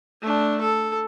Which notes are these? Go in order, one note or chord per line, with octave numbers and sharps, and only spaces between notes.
A3 D4
A4